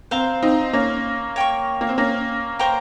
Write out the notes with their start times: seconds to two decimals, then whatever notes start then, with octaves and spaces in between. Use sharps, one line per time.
0.11 C4 C5 F5 A#5
0.43 C4 D#4
0.73 A#3 C#4
1.36 C#5 G5 C#6
1.81 A#3
1.89 C4
1.98 A#3 C#4
2.59 C5 G5 A#5 C#6